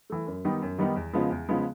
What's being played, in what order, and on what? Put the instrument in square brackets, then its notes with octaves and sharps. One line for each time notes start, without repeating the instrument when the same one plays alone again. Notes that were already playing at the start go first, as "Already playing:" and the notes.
[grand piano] E3 A3
F#2
D#3 G3 B3 D#4
F#2
D#3 G3 B3 D#4
E2
C#3 F3 G#3 B3
E2
C#3 F3 G#3 B3